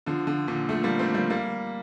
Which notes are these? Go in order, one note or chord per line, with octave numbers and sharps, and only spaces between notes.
D3 F3
D3 F3
A#2 D3
F3 A3
G3 A#3
A3 C4
G3 A#3
G3 A#3